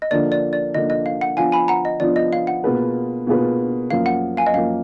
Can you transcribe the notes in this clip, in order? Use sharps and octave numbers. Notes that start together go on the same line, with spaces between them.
D#5
D3 F3 A#3 D4 D5
D5
D5
D3 F3 A#3 D4 D#5
D#5
F5
F#5
F3 B3 D4 F4 F5 G#5
G#5 B5
F#5 A#5
D#5
F3 B3 D4 F4 D5
D#5
F5
F#5
B2 A#3 F4 G#4 B4
B2 A#3 F4 G#4 B4
F#2 F3 A#3 F5
F#5
F5 G#5
D#5
F#2 F3 A#3 F5